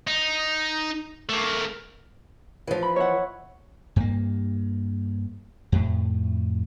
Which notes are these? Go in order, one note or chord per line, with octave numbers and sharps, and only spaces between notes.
D#4
A3 A#3
E3 F3
B5
C#5 E5 F#5
G2 A#3
F2 A2